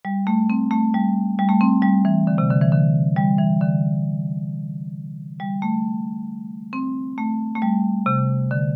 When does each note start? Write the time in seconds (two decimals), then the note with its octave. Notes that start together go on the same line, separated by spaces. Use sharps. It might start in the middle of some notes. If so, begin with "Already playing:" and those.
0.05 G3
0.27 A3
0.50 C4
0.71 A3
0.94 G3
1.39 G3
1.49 A3
1.61 C4
1.82 G3
2.05 E3
2.27 D3
2.38 C3
2.50 D3
2.61 E3
2.72 D3
3.16 G3
3.39 E3
3.61 D3
5.40 G3
5.62 A3
6.73 C4
7.18 A3
7.55 A3
7.62 G3
8.06 C3
8.51 D3